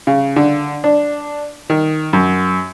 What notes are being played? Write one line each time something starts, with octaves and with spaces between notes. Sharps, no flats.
C#3
D3
D4
D#3
F#2